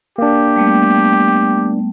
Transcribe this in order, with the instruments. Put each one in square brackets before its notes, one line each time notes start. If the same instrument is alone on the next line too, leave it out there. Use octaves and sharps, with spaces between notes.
[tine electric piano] A#3 D4 [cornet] G4
[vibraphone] G3 A3 B3